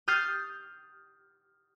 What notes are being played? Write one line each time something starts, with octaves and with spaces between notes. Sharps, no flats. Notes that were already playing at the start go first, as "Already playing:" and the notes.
D#6 F6 G6 A6 C7